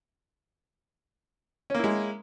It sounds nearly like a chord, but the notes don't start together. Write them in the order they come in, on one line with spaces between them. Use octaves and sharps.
C#4 A#3 E4 G#3